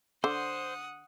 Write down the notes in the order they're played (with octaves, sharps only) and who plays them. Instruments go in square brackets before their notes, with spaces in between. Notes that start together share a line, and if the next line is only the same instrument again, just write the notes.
[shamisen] D3 [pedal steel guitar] C5 [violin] F#5 D#6